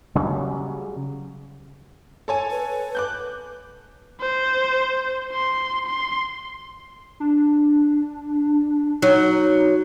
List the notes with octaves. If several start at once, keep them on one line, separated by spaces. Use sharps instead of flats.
C#3 F#3 G3
A4 C#5 G#5
B4
D6 F#6 G6
C5
C6
C6
D4
F#3 D#4